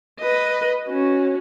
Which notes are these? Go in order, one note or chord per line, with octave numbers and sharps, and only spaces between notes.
B4 D#5
C#4 F#4